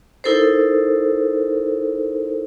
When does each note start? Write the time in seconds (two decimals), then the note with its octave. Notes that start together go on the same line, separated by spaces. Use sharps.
0.24 D#4 E4 A4 A#4 C5